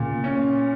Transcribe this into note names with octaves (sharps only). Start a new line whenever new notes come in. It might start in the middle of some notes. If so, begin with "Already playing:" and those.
Already playing: A#2 C#3
C#4